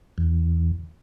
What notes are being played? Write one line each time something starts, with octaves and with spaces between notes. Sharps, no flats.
E2